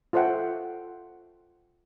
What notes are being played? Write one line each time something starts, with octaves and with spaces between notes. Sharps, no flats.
F4 A4 C5 E5 F#5 G5